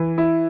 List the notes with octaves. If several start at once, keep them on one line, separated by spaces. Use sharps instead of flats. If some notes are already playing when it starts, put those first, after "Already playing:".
Already playing: E3
E4